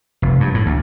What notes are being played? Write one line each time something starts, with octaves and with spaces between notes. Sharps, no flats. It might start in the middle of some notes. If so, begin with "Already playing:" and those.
F1
G2
A2
D2